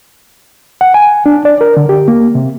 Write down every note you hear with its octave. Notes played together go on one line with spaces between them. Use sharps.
F#5
G#5
D4
D5
A#4
D3
G4
A#3
C3